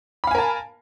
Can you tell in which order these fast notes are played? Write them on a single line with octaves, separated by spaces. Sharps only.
B5 F5 G#5 A#4 A5